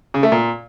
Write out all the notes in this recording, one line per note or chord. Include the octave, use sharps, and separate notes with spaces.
C#3
A3
A#2